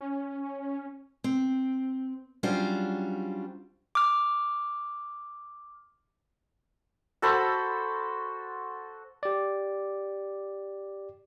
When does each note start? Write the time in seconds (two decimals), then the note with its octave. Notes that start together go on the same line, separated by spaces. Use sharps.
0.01 C#4
1.24 C4
2.43 F#3 G3 C#4 D4 F4 C5
3.95 D6 F6
7.22 F#4 A4 C5 B5
9.23 G4 D5